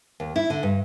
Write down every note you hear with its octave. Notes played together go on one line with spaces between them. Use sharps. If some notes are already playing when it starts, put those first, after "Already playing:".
D#2
E4
D3
G2